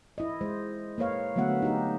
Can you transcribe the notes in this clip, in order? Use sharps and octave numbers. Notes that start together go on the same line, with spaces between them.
E4 D#5
G#3 C5
A#3 B4 C#5 F5
D3 F#3 A3 B3 E5 F#5
D#4 G4